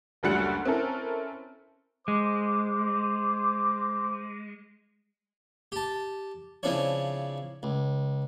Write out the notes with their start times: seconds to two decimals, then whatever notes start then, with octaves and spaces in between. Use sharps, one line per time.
0.23 F#1 D2 F#3 G3 F#6 C#7
0.65 C4 C#4 E4 A4 A#4
2.08 G#3 C5 D6
5.72 G4 A5
6.63 C#3 F3 C4 D4 E4 C#5
7.63 C#2